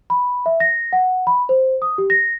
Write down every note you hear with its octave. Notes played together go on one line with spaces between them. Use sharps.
B5
E5
A#6
F#5
B5
C5
D#6
G4
A#6